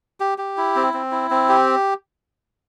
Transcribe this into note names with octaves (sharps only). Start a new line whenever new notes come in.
G4
G4
E4
C4
C4
E4
C4
G4